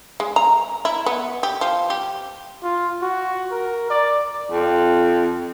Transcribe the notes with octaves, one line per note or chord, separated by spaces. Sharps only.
G#3
A#5
E4
B3
G4
F3
G4
F4
F#4
A#4
D5
F2